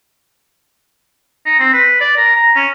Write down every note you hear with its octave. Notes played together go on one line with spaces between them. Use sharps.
D#4
C4
B4
D5
A#4
A#5
C#4